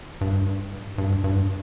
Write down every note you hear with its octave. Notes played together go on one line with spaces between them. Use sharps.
G2
G2
G2